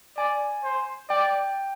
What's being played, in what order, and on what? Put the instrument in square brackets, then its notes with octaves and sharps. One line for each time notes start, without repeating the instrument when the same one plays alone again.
[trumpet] D5 [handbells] G#5
[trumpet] C5
[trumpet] D5 [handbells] G5